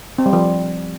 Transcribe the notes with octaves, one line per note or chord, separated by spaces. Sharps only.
C4
G3
F3